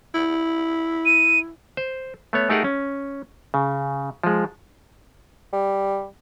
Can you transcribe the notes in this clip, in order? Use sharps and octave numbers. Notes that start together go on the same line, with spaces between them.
E4
D#7
C5
A3 B3 C#5
A3 D#4 G4 G#4 A#4 F#5
C#4
C#3
F3 G#3
G3